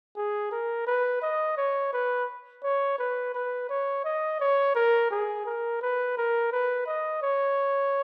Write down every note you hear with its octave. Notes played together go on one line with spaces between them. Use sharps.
G#4
A#4
B4
D#5
C#5
B4
C#5
B4
B4
C#5
D#5
C#5
A#4
G#4
A#4
B4
A#4
B4
D#5
C#5